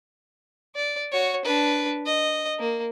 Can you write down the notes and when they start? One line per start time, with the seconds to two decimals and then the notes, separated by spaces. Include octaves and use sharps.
0.76 D5
1.12 F#4 C#5
1.45 D4 B4
2.06 D#5
2.59 A#3